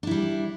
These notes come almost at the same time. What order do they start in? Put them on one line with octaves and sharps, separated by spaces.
D4 E4 G3